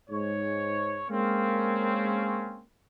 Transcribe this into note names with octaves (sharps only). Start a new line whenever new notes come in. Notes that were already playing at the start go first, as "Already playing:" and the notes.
G#2 C#5
G#3 A#3 C4 C#4